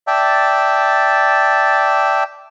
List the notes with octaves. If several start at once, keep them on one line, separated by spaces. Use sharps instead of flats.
D5 E5 G5 A5